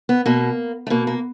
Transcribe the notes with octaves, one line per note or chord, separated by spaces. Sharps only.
B3
B2 A#3
A3
B2 A#3
A#3